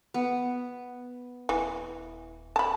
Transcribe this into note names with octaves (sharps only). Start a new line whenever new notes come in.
B3
D#1 E3
A5 B5